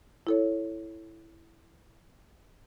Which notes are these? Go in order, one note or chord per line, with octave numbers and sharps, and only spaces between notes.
E4 A4 C#5